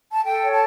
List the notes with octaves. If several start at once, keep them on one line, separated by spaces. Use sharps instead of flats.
A5
A4 G5
C#5
A5